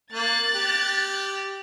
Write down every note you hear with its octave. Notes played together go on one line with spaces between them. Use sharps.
A#3 F#6 A6
G4